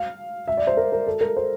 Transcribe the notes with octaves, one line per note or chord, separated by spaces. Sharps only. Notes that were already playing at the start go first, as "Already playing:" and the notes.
Already playing: F5
E5
D5
C5
A#4
A#4
A4
A#4
C5